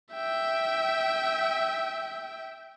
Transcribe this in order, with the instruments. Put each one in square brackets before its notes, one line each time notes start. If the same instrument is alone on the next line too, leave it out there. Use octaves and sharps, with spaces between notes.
[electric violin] E5 G5